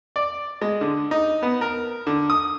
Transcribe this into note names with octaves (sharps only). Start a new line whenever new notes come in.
D5
G#3
D3
D#4
B3
A#4
D3
D#6